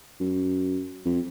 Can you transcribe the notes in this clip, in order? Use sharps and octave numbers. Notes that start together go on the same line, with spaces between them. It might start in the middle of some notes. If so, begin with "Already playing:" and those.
F#2
F2